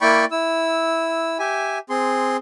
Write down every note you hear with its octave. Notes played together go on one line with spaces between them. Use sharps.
A#3 E4 D5 G5 B5 C#6
E4 E6
G4 E5 G#5
C4 G#4 C6